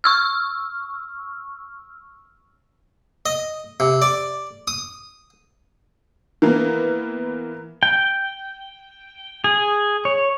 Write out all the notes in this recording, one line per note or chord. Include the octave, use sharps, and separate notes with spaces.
C#6 E6 F6
D#5
C3
D5
D#6
E3 A#3 B3
G5
G#4
C#5